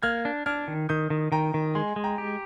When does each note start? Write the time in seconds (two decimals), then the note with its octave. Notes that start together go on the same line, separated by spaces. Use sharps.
0.03 A#3 F6 G#6
0.25 D4
0.46 D4 F6 G#6
0.68 D#3
0.89 D#3 D#6 G6
1.10 D#3
1.32 D#3 G5 A#5
1.54 D#3
1.75 G#3 G#5 C6
1.96 G#3
2.04 G5 A#5
2.18 G4